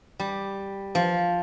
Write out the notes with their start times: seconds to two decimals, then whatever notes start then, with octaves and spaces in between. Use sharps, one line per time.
0.20 G3
0.95 F3